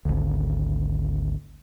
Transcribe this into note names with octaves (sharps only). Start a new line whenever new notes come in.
G#1 D2